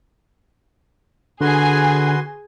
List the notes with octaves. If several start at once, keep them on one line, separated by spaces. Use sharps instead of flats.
D3 F#4 G#4 B4 G#5 C6